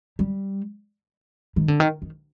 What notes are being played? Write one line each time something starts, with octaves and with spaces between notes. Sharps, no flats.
G3
D#3
D3
D#3
D#3